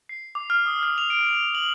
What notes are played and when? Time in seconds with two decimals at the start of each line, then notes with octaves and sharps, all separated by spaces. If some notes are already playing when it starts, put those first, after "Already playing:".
0.09 C7
0.35 D6
0.50 F6
0.66 D#6
0.83 F6
0.98 F7
1.10 D7
1.40 G7
1.55 F#7